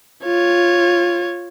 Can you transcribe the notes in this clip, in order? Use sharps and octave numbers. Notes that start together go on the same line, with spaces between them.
F4 C#5